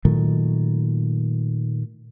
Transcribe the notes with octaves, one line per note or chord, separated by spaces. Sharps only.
A#2 D#3 F#3 A3